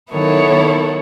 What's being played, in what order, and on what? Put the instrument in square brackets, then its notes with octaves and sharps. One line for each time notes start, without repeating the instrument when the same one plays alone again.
[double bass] D#3 [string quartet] F#3 B3 E4 A4 C#5
[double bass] D#3